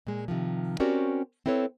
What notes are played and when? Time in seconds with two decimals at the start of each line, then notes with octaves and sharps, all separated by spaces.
0.07 A#2 G#3
0.28 C3 D#3 F3
0.80 C4 C#4 F#4 G4 A#4 D5
1.46 C4 E4 A4 B4 C#5